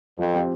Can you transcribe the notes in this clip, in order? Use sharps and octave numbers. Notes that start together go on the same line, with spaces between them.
F2 F3
C4 G4